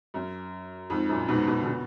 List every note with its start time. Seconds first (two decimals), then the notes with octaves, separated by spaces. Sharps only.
0.14 F#2
0.90 F2 G#2
1.09 F#2 A#2
1.28 G#2 B2
1.46 G#2 B2
1.61 D3
1.65 B2